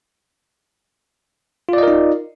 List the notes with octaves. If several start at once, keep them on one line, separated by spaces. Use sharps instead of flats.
D#4 F4 A#4 D5 D#5